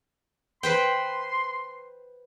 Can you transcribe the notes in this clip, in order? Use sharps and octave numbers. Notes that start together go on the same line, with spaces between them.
B4 C5 G5 C6